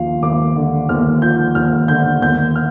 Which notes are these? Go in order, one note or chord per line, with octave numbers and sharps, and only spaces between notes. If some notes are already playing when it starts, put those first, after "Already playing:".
Already playing: D#2 F3 F5
D#2 D6
D3
D#2 F6
F3 G6
D#2 F6
D3 G6
D#2 G6
F6